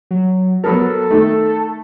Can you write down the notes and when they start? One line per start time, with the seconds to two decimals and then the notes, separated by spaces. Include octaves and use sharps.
0.11 F#3
0.64 F#3 B3 A4 A#4
1.11 D#3 A3